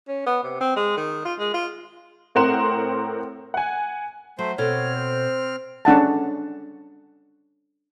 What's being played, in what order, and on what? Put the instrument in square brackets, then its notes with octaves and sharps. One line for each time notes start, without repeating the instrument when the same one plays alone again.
[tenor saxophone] C#4
B3
C3
C4
G#3
D#3
F4
G#3
F4
[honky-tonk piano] A2 C4 A#4 F#5 C6 E7
F#5 G#5
[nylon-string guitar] F#3 [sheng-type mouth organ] A3 C5
[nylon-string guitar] B2 A4 [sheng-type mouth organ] C4 F6 [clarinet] C#5
[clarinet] C5
[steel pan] C#4 D4 F#5 A5